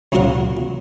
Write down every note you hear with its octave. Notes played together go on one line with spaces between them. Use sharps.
C#2 F#2 A#2 A#3 A#4 F#5